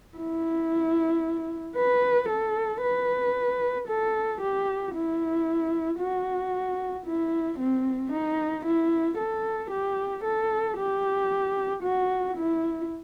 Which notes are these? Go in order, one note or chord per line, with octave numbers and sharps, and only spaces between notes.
E4
B4
A4
B4
A4
G4
E4
F#4
E4
C4
D#4
E4
A4
G4
A4
G4
F#4
E4